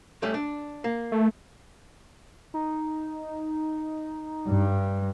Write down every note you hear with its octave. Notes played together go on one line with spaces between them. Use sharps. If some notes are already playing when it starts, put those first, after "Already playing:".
G3 A3 C#4
D4
A#3
A3
D#4
G2